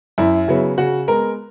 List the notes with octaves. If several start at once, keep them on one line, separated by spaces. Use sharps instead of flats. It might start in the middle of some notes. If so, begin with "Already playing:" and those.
F#2 E4
C#3 F#3 B3
C#3 F#4
G#3 B3 A#4